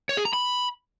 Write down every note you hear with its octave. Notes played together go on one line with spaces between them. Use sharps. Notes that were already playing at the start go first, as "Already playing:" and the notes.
C#5
G#4
A#5
B5